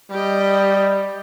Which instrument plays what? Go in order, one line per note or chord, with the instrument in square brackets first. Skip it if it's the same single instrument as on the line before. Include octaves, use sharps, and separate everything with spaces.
[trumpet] G3 [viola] G4 D#5